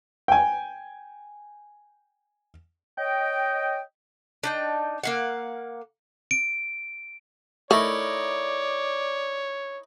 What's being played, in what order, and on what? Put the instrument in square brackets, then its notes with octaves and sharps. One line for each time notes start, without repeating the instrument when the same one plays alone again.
[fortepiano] G5 G#5
[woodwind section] C#5 D#5 G5
[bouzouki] D4 D#4 G5
A#3 F5 F#5
[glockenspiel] D7
[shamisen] A3 [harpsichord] D#4 E4 A#4 [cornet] C#5 [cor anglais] D5